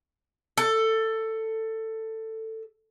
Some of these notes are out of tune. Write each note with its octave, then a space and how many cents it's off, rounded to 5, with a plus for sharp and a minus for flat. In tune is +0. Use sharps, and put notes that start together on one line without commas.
A4 +15